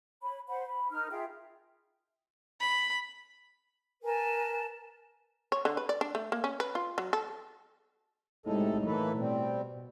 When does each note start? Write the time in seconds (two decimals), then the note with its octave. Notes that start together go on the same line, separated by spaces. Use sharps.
0.23 C#5 B5
0.49 C5 F#5 B5
0.66 B5
0.91 D#4 A#4 F6
1.11 F4 G#4 E5 G5
2.61 B5
4.03 A#4 B4 G#5 A5
5.52 C#5
5.65 D3
5.77 B4
5.89 D5
6.01 D4
6.15 A3
6.32 A#3
6.44 C#4
6.60 B4
6.75 F4
6.98 F#3
7.13 A4
8.46 A2 C3 G#3 D#4 A4
8.85 E3 A#3 A4 B4
9.18 B2 G3 C4